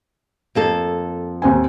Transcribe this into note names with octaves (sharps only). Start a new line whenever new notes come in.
F2 A#3 A4
D#2 C4 G#5